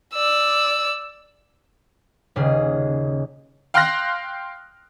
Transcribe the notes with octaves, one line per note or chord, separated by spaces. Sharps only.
D5 E6
D#1 C#3 G#4
F5 G5 C6 F6 F#6 A#6